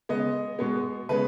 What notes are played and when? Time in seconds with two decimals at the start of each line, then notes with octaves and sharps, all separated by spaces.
0.09 C#3 G#3 B3 D#5
0.59 B2 G#3 B3
1.09 C#3 G#3 B3 B4